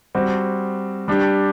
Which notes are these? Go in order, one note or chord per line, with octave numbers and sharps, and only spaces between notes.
G3 C4 F#4
G3 D4 G4